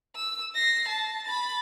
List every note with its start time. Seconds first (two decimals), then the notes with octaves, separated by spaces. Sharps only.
0.16 E6
0.55 A#6 C7
0.88 A5
1.25 B5 A6